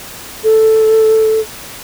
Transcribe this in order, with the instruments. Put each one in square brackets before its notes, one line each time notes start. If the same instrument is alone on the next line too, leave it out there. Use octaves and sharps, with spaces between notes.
[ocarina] A4